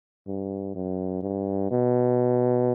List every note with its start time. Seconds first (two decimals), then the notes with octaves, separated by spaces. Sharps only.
0.27 G2
0.75 F#2
1.23 G2
1.71 B2